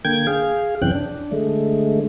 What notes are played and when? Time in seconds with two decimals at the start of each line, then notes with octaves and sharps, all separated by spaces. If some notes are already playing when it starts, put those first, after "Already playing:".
0.05 D3 A#3 G5 G#6
0.27 G#4 F5
0.82 F#2 C3 E3 C#4 G5 F#6
0.95 D4
1.32 D3 G#3 A3